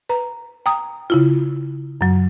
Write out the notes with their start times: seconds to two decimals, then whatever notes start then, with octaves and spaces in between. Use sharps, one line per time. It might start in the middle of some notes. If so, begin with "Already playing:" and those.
0.10 B4 A#5
0.66 G5 A#5 D#6
1.10 C#3 E4 F4
2.01 F#2 F#3